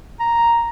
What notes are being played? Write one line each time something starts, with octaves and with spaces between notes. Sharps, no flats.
A#5